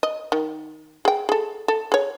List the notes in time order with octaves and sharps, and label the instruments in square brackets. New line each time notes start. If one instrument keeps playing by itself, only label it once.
[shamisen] D#5
D#3
G#4 G5
G#4 A4
A4
G#4 C#5